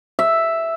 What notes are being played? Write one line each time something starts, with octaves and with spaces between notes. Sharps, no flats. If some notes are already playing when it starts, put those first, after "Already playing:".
E5